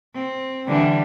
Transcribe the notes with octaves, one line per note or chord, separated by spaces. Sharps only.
C4
D3 E3 G3